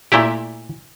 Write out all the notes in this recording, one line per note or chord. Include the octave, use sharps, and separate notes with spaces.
A#2 A3 E4 G4